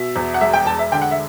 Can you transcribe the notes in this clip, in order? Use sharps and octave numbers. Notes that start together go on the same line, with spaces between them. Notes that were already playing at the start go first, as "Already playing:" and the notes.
Already playing: B2 E5
E2
F#5
E1 E5
G5
E1 A5
E5
D3 G5
F#5
E5